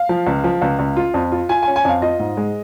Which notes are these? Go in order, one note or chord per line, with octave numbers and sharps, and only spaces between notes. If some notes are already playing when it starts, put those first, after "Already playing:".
Already playing: F5
F3
C#2
F3
C#2
C#2
F4
F2
F4
F4 G#5
G#5
C#4
G#5
F2 F5
F4 D#5
G#2
G#3